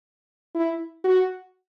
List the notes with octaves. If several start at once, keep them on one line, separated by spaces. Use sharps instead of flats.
E4
F#4